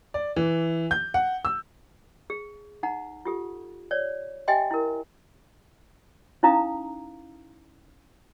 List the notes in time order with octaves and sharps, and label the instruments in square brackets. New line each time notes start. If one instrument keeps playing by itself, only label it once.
[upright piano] D5
E3
G6
F#5
E6
[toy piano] G#4
D#4 F#5 A#5
F4 G4 A4
C#5 D5
G4 D#5 E5 G5 G#5 C6
E4 A#4
C#4 D#4 E4 F5 A#5 D#6